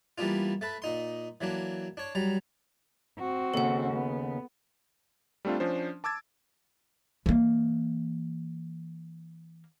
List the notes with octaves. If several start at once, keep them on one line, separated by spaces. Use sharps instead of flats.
E3 G3 A#3 B3 D4 F4
A3 A4 B4
A#2 D#4 C6
E3 F#3 A#3 D4
D4 C#5
F#3 G3 A#5
C4 F#4
D#2 C#3 A4 F#5
B3
G3 A3 C4 D4 F4
F3 C#4 D4 C5
A5 D6 E6 G#6 A6
E3 A#3